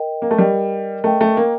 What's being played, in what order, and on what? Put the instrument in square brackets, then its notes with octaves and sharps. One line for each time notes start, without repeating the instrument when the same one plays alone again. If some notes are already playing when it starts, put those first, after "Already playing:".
Already playing: [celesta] A#4 D#5 G5
[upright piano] A#3
A3
[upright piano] G3 [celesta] A#4 D#5 G5
[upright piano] A3 [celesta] A#4 D#5 G5
[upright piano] A3
A#3